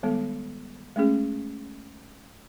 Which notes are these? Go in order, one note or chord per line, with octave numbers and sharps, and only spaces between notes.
D#3 G3 G#3 B3 A4
G#3 A3 C#4 G#4